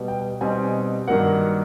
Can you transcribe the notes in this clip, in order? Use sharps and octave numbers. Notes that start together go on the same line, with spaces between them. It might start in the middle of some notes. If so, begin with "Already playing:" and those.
Already playing: B2 G3 B3
G5
B2 G3 C4 D#4 G#5
G2 D#3 F#3 A#3 F#5